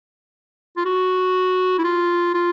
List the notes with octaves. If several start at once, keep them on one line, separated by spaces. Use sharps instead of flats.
F4
F#4
E4
F4
F4